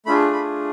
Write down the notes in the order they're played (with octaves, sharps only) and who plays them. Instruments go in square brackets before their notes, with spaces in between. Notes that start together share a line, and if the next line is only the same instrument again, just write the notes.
[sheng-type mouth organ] A3 D4 F4 G#4 B5
B5